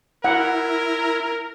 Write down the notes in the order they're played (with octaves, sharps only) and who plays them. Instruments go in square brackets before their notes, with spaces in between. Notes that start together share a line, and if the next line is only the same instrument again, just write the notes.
[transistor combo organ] E4 [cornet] A#4 [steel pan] F#5